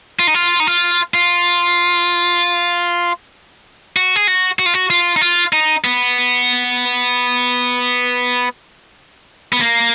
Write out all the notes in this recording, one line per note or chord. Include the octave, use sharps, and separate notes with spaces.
F4
D#4
F4
D#4
F4
F4
F#4
G#4
F#4
F#4
F4
F#4
F4
D#4
F4
D#4
B3
B3
A#3